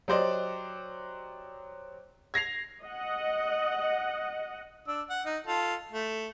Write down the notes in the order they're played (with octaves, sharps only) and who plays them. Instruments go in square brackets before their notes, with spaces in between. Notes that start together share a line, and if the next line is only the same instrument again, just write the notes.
[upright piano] F#3 G4 C5 D5 D#5
G#6 A#6 C7 F7
[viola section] D#5 F#5
[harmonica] D4 E6
F#5
D#4
F4 A4
A3